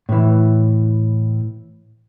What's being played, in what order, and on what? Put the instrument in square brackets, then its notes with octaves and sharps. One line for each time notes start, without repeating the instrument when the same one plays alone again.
[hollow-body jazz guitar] A2 E3